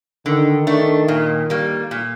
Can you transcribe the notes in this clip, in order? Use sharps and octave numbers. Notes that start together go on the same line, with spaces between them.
D3 D#3
A3 D4
A#2
G3 A#3
A#2